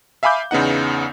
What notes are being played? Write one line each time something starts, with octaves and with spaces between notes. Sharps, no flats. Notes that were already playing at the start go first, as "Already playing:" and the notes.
E5 F5 G#5 B5 D6 G6
E2 C#3 B3 D#4 F#5